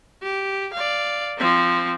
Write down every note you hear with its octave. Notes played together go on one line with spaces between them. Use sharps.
G4
D5 F5
F3 C4